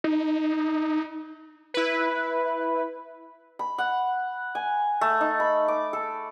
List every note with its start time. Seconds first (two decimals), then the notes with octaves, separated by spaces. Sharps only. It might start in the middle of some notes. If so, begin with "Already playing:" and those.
0.04 D#4
1.74 E4 B4
3.59 B5
3.78 F#5
4.55 G#5
5.01 A3
5.21 D#4
5.40 B5
5.68 D6
5.93 A4